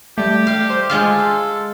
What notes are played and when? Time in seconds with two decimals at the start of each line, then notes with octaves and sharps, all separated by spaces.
0.18 G3 A3 G4
0.47 F5
0.70 C5
0.90 G#3 F4 F5
1.09 A4